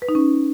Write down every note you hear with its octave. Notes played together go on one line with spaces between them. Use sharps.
B4
D#4
C#4